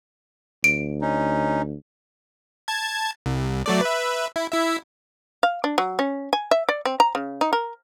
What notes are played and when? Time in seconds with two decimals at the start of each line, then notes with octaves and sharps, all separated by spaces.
0.64 D2 D7
1.02 C#4 D#4
2.68 A5 G#6
3.26 C2
3.66 F#3 A3 D5
3.81 B4 E5
4.36 E4
4.52 E4 E5
5.43 F5
5.64 D4
5.78 F#3
5.99 C#4
6.33 G#5
6.51 E5
6.69 D5
6.85 C4
7.00 A#5
7.15 C#3
7.41 D#4
7.53 A#4